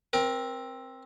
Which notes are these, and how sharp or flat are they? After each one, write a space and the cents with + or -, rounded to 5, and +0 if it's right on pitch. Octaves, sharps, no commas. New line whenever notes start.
C4 +10 A#4 +30